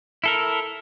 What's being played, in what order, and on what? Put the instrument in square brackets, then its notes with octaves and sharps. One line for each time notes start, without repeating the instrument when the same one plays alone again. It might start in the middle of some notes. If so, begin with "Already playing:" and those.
[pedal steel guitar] E4 A4 A#4